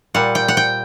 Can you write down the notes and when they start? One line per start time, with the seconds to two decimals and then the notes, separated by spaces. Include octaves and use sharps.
0.14 A#2 G3 F#5
0.35 G5
0.48 F#5
0.57 G5